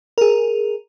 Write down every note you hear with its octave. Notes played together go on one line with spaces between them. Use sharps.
G#4 A#4